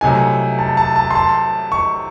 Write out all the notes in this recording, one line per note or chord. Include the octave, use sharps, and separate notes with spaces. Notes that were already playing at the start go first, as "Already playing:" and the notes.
C2 C3 F#3 A3 D#4 G#5
A5
A5
A5
C6
A5
C#6